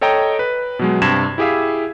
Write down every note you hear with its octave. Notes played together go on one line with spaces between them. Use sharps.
A4 C#5 D#5 G5 A#5
B4
B2 F#3 G#3
G2 C3 C4 A5 G#6 E7
E4 G4 G#4 E5 F5